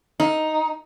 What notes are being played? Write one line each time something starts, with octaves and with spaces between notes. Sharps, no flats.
D#4